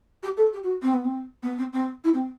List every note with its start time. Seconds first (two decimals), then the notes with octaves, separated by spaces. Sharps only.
0.23 G4
0.37 A4
0.53 G4
0.63 F#4
0.82 C4
0.94 B3
1.05 C4
1.43 B3
1.58 C4
1.73 C4
2.04 E4
2.14 C4